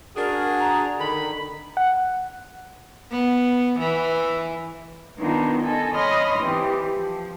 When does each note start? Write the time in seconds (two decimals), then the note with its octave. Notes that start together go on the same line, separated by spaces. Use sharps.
0.16 D4 F#4 G#4 A#4
0.59 A#5
0.99 D3 D#3 B5
1.77 F#5
3.12 B3
3.79 E3
5.18 D#3 B3 D4 D#4 F4
5.61 A4 D#5 G#5
5.94 C#5 D#5 B5 C6 D#6 F6
6.38 E3 C4 G4
6.95 F3